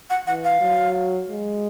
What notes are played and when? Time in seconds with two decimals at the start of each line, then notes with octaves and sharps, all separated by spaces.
0.10 F#5
0.27 E3 F#5
0.44 F5
0.61 F#3
1.28 G#3